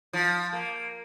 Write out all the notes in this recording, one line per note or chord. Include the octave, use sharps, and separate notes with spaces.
F3
A#3